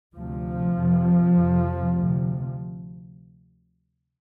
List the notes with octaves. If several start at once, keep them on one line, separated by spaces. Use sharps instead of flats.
D2 C3 F3
F2 C3
F2 C3
D2 C3